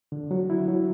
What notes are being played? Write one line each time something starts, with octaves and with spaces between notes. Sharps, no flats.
D3
F#3
E4
F#3